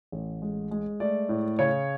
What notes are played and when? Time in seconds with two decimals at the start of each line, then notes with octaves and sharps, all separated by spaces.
0.12 A1
0.42 G#3
0.71 G#3
1.00 A3 D5
1.29 A2
1.59 C#3 C#5